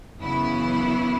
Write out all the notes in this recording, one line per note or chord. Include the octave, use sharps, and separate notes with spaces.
F#2 C#3 E3 B3 E4